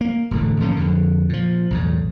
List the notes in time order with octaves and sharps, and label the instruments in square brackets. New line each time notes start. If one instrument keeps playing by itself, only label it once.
[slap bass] A#3
E1 A2 D3
A#1 D#3 A#3 C#4
F2 D3
A#2 F3
B1 E2 A2